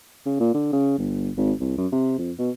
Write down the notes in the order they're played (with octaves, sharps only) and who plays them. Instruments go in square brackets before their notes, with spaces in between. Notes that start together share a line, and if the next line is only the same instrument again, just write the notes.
[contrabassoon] C#3
A#2
D3
C#3
G1
G#1
C2
F#2
C3
F2
B2